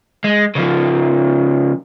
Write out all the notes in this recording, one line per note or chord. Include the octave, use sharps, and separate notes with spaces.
G#3
C#3 F3